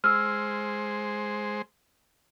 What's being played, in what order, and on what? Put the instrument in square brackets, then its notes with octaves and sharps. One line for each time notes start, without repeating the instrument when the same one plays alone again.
[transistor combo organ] G#3 C5 [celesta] E6 F6